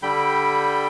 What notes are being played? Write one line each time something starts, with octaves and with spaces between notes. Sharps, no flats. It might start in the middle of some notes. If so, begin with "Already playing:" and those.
D3 G3 G5 B5 G6